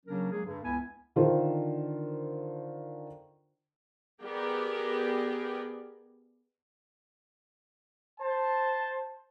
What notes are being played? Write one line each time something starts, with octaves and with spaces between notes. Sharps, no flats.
C#3 F#3 A#3 C#4 D4 A#4
F#3 G#3 A#3 G#4
G2 D3
C#2 B3 E4 G#5
D3 D#3 D4 F4 A#4 C5
B3 G4 G#4 A#4 D5 G5
C5 A5